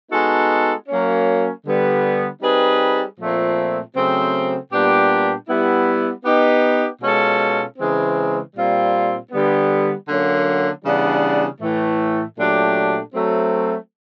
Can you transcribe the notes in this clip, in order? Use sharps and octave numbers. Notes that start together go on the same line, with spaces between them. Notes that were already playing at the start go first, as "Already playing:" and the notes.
G#3 B3 D#4 F#4 A4
F#3 A#3 C#4
D3 G3 B3
G3 C4 D#4 G#4 B4
A#2 F3 A3 C4
C#3 F#3 A3 C4
A#2 G3 B3 D4 G4
G3 B3 E4
B3 D#4 G4
B2 G#3 C#4 F4 A4
C#3 E3 G#3 C4
A#2 G3 C4 F4
D3 G3 B3
D3 F#3 A#3 C#4
C#3 E3 G3 B3 D4
A2 E3 A3
A#2 F#3 A3 D4 G4
F#3 A3 C4